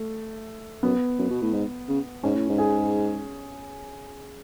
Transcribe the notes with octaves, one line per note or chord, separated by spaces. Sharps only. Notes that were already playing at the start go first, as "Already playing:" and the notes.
Already playing: A3
F#2 B3
F#2
B2
A2
G#2
C#3
G#2 C#4
A2
G#2
G#4